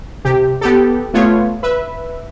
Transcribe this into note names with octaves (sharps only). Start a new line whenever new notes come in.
C3 G4
B3 G4 A4
A3 B3 F4 C#5
B4 E5